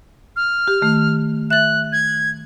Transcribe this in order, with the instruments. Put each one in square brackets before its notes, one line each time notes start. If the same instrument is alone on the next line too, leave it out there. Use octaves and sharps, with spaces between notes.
[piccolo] F6
[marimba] G4
D#3 A3
[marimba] E5 A6 [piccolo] F#6
[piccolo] G#6